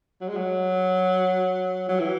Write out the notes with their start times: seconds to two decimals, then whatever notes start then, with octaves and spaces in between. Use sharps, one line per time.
0.21 F#3
0.29 G#3
0.36 F#3
1.89 F#3
1.99 E3